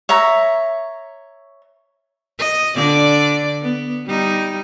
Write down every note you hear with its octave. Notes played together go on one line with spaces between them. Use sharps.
C#5 E5 A#5
D#5
D3 D5
B3
G3 D#4